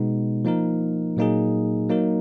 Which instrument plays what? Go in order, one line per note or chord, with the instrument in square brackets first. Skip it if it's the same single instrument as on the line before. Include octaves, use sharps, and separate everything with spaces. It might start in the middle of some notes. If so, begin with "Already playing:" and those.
Already playing: [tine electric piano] B2 G#3 B3 D#4
F3 A#3 D#4 A#4
A#2 F#3 A#3 D#4 G#4
F#3 A#3 D#4 A#4